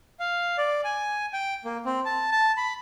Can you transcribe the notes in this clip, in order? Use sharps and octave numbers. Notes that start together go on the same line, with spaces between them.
F5
D5
G#5
G5
A#3
C4
A5
A5
B5